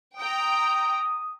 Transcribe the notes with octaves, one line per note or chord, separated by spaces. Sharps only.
G5 A#5 D#6